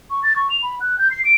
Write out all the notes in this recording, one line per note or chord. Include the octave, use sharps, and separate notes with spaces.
C#6
A6
C#6
F7
B5
F#6
G6
C7
D7